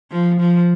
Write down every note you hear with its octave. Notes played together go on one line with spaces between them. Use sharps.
F3
F3